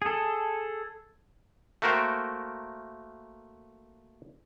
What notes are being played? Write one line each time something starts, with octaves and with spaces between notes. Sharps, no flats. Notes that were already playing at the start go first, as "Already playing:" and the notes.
G#4 A4
A3 A#3 F#4 A#4 C5 G5